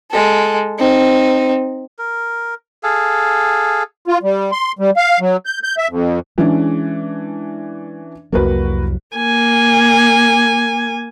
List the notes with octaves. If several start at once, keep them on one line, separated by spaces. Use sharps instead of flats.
G#3 A4
C4 D#4
A#4
G#4 A4 F5
F4
G3
C6
G3
F5
F#3
G6
G6
E5
F2
E3 G#3 C#4 D4
C2 F2 F#3 A#3 F#4 B4
A#3 G#5